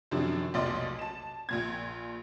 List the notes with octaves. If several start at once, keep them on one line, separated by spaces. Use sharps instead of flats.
F#2 C3 D#3 F3 D4
F1 B1 A#2 D5 D#5 C6
A5 E7
A#1 A#2 G#6